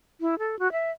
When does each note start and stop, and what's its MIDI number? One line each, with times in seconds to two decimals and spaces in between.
0.21 0.38 64
0.39 0.58 69
0.59 0.71 66
0.72 0.91 76